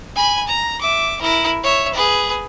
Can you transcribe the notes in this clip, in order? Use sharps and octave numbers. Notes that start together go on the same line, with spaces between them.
G#5 B5
A#5
E5 D6
E4 A#4
C#5 E5
G#4 B4